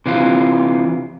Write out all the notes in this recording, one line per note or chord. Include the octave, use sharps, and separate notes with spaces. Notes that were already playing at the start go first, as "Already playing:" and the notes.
C3 E3 F4